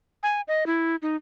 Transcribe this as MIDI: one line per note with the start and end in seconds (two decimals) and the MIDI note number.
0.23 0.41 80
0.48 0.66 75
0.66 0.96 64
1.02 1.16 63